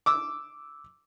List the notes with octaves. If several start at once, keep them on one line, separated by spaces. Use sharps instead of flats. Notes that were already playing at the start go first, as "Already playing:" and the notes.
D6 E6